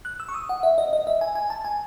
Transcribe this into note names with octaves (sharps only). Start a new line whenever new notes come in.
F#6
E6
C#6
D#6
F#5
E5
D#5
D#5
E5
G#5
G#5
A5
G#5